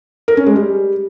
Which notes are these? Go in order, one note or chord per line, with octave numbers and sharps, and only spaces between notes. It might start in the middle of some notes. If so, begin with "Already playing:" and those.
A#4
C#4
G#3
G3